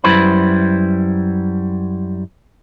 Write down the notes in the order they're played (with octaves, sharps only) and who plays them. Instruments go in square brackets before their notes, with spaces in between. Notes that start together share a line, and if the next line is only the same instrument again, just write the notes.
[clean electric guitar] F#2 G3 E4 B4 C5 B5